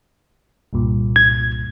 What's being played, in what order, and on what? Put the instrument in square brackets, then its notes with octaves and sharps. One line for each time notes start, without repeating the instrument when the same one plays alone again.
[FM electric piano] C2 G2 A#2
[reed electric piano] G#6